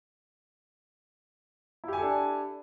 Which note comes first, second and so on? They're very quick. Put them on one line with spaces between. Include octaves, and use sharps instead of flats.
E4 G4 G#5 A4 D4